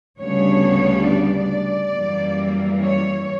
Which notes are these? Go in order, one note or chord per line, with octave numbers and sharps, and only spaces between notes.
D2 C#3 G3 B3 D4 C#5
D5
F#2 E3 G3 A#3
C#5